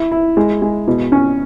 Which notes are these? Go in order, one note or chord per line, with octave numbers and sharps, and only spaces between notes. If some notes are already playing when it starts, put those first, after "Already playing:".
Already playing: E4
E4
G#3
G#3
B2
C#4